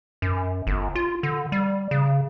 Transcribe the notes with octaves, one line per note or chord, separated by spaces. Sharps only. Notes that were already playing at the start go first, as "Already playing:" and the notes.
F#2
G1
F4
D3
G3
C#3